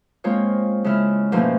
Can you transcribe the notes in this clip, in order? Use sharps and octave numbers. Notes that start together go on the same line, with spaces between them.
G#3 A#3 C4 F4 C#5
C#3 G#3 C#4 E4 F6
G#2 B2 F3 A3 A#3 C#4